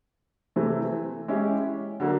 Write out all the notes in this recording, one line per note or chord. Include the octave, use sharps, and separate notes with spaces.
C3 E3 A3 C4
G#3 C#4 E4 G4
D3 F#3 A#3